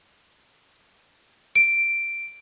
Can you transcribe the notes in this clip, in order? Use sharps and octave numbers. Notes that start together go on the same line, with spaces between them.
D7